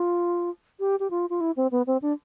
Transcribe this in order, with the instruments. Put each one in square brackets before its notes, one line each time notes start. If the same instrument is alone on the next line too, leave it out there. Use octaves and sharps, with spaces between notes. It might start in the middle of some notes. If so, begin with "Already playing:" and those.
Already playing: [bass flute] F4
G4
G4
F4
F4
E4
C4
B3
C4
D4